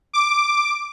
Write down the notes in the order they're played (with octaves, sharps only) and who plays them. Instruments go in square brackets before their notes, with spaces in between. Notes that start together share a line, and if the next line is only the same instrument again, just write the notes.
[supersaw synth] D6